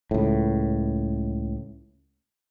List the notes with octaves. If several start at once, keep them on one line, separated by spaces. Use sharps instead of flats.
C#2 A2